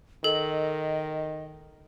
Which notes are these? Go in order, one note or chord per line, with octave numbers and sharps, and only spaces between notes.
D#3 A4 D#5